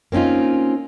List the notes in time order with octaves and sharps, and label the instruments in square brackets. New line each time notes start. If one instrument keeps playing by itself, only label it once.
[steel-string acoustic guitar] A#3 C4 C#4 D#4 F4